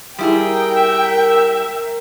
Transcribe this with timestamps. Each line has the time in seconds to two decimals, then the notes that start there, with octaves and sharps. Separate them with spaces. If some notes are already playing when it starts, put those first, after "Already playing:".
0.18 G3 E4 G#4 A#4 G5 D#6
0.75 E5